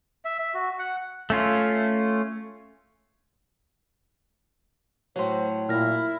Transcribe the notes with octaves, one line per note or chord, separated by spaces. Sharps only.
E5
E5
F#4
F#5
A3 C#4 F4
A2 F#3 C5 C#5 C6
A#2 E4 F6 A#6